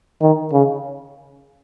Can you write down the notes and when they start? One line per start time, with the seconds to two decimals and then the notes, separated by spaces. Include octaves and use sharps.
0.21 D#3
0.52 C#3